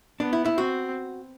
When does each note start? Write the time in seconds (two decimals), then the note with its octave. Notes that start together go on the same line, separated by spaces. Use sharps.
0.20 B3 D4
0.33 E4
0.45 E4
0.57 C4 F#4